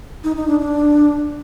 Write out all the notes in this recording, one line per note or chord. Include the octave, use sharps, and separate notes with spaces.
D#4
D#4
D4
D4